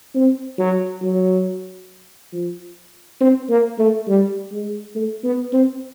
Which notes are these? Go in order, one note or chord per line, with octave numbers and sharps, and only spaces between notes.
C4
F#3
F#3
F3
C4
A#3
A3
G3
G#3
A3
B3
C4